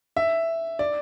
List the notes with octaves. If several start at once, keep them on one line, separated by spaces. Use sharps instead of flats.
E5
D5